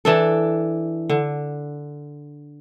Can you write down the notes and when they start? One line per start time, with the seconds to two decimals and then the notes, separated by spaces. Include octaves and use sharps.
0.05 E3 D4 A4
1.10 D3